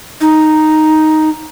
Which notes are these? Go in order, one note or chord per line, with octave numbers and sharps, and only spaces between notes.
D#4